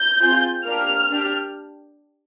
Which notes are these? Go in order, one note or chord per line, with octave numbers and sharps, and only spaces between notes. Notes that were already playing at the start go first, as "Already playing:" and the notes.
Already playing: G6
C4 F4 G#4
A#3 D4 G4 F6
D4 G4